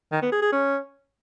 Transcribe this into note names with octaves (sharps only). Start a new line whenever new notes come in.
D#3
B3
G#4
G#4
C#4